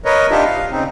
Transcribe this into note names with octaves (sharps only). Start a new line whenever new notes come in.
A#4 B4 C#5 D#5
D4 D#4 F4 G4 D#5 E5
F5
C#3 C4 D#4